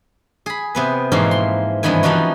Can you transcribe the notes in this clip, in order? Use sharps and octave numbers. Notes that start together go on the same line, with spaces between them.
G#4 B5
C3 B3 B4
G#2 B2 E3 F3 A#3
C6
G2 C3 D#3 E3 B3 G#5
E3 F3 G3 D4 D#4 F#4